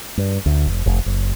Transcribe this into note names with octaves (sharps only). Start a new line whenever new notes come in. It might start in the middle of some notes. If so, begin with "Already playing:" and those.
G2
D2
F1
F1
F#1